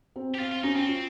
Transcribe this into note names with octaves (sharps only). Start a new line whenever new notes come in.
C4
G4
C4 F4
F4
C#4 D#4
C4
F4